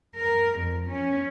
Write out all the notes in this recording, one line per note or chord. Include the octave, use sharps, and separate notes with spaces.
A#4
F2
C#4